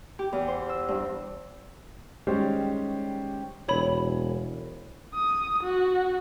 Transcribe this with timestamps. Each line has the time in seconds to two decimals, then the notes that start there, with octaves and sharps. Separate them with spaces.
0.19 G4
0.33 E2
0.48 C5
0.69 E6
0.88 G2
2.27 D#3 G3 G#3 C#4 G4 C5
3.69 E1 C#5 B5
5.15 D#6
5.64 F#4